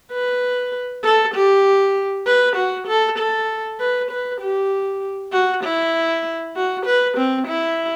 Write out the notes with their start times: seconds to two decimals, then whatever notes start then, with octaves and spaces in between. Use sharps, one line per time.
0.12 B4
1.04 A4
1.35 G4
2.27 B4
2.57 F#4
2.88 A4
3.19 A4
3.80 B4
4.11 B4
4.41 G4
5.33 F#4
5.64 E4
6.56 F#4
6.86 B4
7.17 C4
7.48 E4